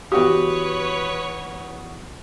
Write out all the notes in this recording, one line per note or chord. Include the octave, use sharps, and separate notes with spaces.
E2 F#4 G4 B4 C#5 D#6